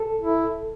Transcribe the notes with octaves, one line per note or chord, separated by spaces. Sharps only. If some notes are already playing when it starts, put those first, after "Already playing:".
Already playing: A4
E4